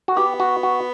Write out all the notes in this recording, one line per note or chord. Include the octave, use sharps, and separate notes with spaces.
F#4
B3 G4
F#4
F#4